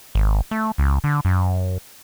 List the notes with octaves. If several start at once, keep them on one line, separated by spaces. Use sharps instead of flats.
G#1
A3
C#2
D3
F#2